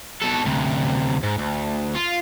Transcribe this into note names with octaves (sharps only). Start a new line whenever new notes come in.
B2 A4
D2 C3
G#2
D2
F4